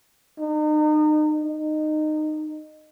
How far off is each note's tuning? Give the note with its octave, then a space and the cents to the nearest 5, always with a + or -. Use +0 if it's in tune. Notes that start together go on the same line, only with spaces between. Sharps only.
D#4 -35
D#4 -20